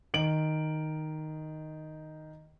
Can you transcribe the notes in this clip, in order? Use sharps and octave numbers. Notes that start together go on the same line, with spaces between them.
D#3 D7 F#7